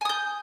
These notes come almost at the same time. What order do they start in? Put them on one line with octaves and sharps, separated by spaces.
G#5 D#6 G6